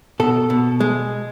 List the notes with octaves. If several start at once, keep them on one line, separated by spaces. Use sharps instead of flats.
B2 A4
B2
G#3